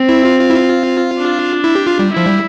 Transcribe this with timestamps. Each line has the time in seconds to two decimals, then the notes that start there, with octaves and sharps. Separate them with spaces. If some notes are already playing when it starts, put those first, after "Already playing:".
Already playing: C4
0.09 E4
0.25 F4
0.40 F4
0.50 E4
0.55 F4
1.18 D4
1.64 E4
1.75 G4
1.87 F4
1.99 G3
2.10 E4
2.17 F3
2.26 G3